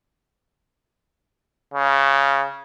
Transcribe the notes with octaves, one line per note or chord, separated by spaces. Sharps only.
C#3